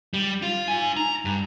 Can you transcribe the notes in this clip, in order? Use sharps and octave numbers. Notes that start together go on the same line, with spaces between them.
G3
F4
D#4 G#5
A#5
G2